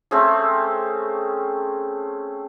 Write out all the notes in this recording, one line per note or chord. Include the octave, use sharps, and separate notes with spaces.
A3 C4 C#4 G#4